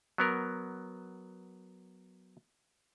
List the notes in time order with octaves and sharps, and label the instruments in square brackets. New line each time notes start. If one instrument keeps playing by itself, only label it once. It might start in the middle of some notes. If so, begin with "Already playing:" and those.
[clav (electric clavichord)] F#3 B3 A#4